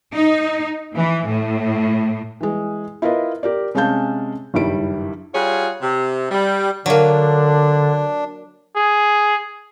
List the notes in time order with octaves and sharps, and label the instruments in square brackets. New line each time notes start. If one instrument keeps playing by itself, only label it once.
[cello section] D#4
E3
A2
[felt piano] E3 G#3
E4 F4 A#4 B4 D#5
G4 A#4 D5
C3 G#3 C#4 F5 A5 G6
F#1 G2 D#3 G3 E4 D7
[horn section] G3 F4 F#4 G#4 C#5
C3
G3
[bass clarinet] D3 [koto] F#3 A#3 [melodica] D4
[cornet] G#4